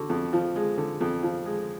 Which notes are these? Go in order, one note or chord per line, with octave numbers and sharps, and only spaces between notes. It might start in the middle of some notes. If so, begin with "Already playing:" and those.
Already playing: D3 F#4
F2
F3
G#3
D3
F2
F3
G#3